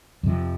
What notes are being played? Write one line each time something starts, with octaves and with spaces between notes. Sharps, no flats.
F2 C3 F3